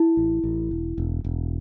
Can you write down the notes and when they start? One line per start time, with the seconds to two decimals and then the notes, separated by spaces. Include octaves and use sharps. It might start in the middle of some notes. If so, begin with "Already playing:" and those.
Already playing: E4
0.17 A1
0.44 A1
0.71 E1
0.98 E1
1.24 E1